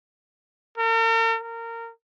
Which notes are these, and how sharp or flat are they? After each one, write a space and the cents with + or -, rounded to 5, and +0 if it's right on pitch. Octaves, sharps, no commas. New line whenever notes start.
A#4 -45
A#4 -20